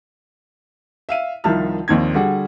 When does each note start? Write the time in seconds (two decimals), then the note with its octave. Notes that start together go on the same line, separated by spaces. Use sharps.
1.09 E5 F5 D#7
1.44 C2 D#3 F3 E5 A5 F6
1.88 A#1 D#2 C4 G#6
2.15 D3 G3 F#4 G#4 F#5